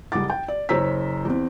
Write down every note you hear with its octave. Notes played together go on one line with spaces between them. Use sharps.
F#1 G3 F#5 D6 A6
G5
D5
F#1 C5 C#5 A#5 E6 B6
E2 C4